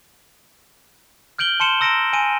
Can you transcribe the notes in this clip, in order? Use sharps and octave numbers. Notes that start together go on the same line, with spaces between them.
F6 G6 D7 F#7 G7
A5 C6 C#7 E7 G7
A#5 E6 A#6 C#7 D7 E7
G#5 D7 D#7